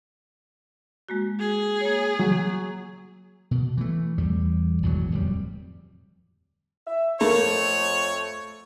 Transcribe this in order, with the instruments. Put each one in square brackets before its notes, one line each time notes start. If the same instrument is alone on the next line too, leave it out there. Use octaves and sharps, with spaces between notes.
[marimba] G#3 A#3 F#4
[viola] G#4
[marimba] A#3 C#5
[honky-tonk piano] F#3 [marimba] F#5
[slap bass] B2
E3 A3
E2 G3
G#1 E2 B2 F#3
D1 F2 G3
[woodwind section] E5
[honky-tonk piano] A3 [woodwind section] A#3 [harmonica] C#5
[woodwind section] F2